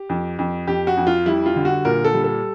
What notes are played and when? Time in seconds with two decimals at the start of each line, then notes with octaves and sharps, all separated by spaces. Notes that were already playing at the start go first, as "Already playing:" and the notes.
Already playing: G4
0.09 F2
0.39 F2
0.67 F2 G4
0.87 F#4
0.97 F2
1.07 F4
1.26 G3 E4
1.46 F4
1.56 D3
1.65 F#4
1.85 A#2 A#4
2.04 A4
2.14 G3
2.24 A4